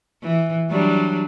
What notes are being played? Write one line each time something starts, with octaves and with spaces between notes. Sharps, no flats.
E3
F#3 G3 D4